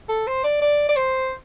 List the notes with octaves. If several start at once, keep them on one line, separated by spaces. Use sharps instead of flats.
A4
C5
D5
D5
D5
C5